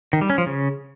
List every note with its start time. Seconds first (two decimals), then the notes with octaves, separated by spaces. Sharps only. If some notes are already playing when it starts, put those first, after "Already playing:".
0.13 D#3
0.21 G3
0.30 C#4
0.38 F3
0.46 C#3